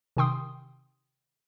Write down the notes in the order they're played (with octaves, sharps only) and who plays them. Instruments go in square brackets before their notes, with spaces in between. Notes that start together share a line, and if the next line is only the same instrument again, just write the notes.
[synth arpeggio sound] C3 D#3 G5 C6 D#6